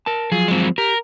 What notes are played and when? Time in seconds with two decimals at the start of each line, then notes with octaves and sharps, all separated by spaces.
0.06 A#4 A5
0.32 F3 F#3 F4 G#4
0.48 G#3 C4
0.78 G4 A#4